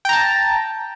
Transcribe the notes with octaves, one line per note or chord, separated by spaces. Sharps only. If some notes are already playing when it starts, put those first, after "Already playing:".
G5 A5 A#5